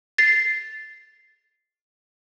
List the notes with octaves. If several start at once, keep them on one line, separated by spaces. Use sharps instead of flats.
A6 C7